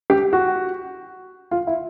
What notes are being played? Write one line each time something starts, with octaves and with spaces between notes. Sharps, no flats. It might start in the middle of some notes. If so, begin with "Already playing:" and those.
G4
F#4
F4
E4